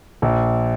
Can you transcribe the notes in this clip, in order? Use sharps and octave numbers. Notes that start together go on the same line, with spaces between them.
A#1